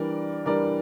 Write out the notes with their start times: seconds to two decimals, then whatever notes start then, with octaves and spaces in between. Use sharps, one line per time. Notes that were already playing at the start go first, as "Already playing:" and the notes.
Already playing: E3 G3 D4 A#4 D5
0.46 E3 G3 D4 A#4 D5